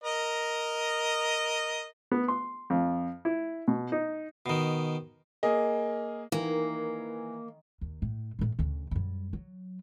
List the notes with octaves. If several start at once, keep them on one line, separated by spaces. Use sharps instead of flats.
A#4 D#5
B3
C6
F2
E4
B2
D#4
B2 D#3
A#3 G#4 D#5
D#3 E3 A#3
D#2
A2
A2 D3
D2 C#3
F#2 G3
F#3